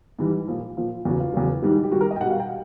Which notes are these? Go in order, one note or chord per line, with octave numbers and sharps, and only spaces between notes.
G#2 E3 G3
A#2 F3
A#2 F3
E2 C#3 F#3 F#4
F4
E2 C#3 F#3
G#2 D#3 G3
G4
G#2 D#3 G3 F#4
A#4
D#5
G5
B2 G3 F#5
F5
G5